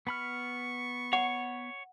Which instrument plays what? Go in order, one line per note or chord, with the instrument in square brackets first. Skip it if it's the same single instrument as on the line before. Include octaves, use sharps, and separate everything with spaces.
[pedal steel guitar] B3 B5 F6 [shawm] C#6
[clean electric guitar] C#5 [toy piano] F#5